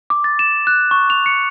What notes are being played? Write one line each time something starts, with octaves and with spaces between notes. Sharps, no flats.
D6
A6
E7
F#6
C#6
F7
C#7